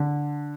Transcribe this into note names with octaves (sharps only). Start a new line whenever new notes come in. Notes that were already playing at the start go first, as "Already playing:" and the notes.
Already playing: D3